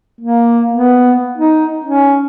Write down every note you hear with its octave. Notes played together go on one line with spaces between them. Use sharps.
A#3
B3
D#4
C#4